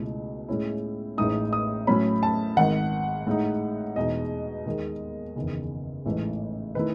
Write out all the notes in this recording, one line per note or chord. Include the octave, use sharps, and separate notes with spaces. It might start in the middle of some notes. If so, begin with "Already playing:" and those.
Already playing: C#2 B2 A3 E4
A2 G#3 C#4 E4
A1 A2 G#3 D#4 D#6
D#6
A2 F#3 A3 C#4 B5
A5
G#1 G#2 D#3 F#5
A2 G#3 D#4
E2 B2 G#3 D#4 D#5
D#2 D#3 G#3
F#1 E2 D#3
A1 G#2 E3 A3
D#3 A3 E4 B4